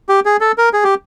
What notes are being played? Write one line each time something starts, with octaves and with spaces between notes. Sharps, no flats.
G4
G#4
A4
A#4
G#4
G4